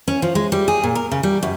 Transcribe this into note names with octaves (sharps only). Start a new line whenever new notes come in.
C#4
F3
G#3
G3
G#4
A#2
A#4
C#3
G3
F#2